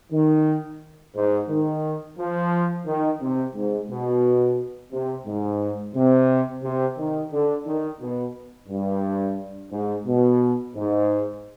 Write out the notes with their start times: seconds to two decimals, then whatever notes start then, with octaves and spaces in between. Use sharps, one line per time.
0.12 D#3
1.15 G#2
1.49 D#3
2.18 F3
2.86 D#3
3.21 C3
3.55 G#2
3.89 B2
4.92 C3
5.26 G#2
5.94 C3
6.63 C3
6.98 D#3
7.32 D3
7.66 D#3
8.01 B2
8.69 G2
9.72 G#2
10.06 B2
10.75 G#2